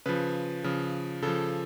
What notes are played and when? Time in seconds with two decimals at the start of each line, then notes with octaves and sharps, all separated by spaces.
0.06 C#3 F3 B4
0.64 C#3 F3
1.22 C#3 A4
1.27 F3